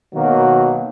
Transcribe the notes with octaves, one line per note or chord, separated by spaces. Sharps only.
B2 D#3 F#3 A#3